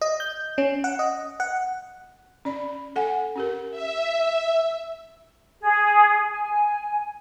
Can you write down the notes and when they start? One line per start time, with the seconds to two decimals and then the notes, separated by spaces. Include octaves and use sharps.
0.01 D#5
0.20 G6
0.58 C#4
0.84 F#5
0.99 D#5
1.40 F#5
2.45 C#4 D5 B5
2.96 A4 F#5 G#5
3.36 C#4 G4 A#4
3.71 E5
5.62 G#4
6.29 G#5